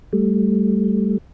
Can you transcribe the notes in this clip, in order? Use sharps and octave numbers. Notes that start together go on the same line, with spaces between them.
G3 A3